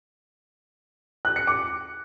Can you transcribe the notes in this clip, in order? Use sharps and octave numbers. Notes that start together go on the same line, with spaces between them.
F#6
C#7
D6